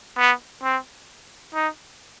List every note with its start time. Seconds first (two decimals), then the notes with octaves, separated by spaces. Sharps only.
0.18 B3
0.64 C4
1.54 D#4